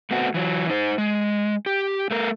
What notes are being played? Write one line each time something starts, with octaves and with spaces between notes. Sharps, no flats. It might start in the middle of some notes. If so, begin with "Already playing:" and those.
A3 B3 C4 F#4
E3 F#3
D#4 C5
G#3
G4
A3 A#4